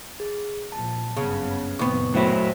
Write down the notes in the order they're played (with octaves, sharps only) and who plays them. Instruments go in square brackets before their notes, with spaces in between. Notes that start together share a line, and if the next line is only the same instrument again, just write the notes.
[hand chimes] G#4
[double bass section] A#2 F3 [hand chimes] A5
[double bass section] F#1 G2 B3 [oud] C#3
[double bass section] F#1 A#2 C4 [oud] D#2 B3 [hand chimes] C#6
[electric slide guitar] A2 F#3 E4 [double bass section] A3 [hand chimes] C5